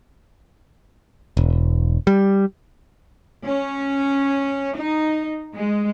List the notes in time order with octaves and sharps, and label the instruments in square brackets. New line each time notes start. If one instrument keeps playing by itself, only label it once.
[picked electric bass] E1
G3
[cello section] C#4
D#4
G#3